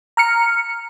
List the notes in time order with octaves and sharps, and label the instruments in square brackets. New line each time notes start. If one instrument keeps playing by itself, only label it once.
[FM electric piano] A#5 F6 C#7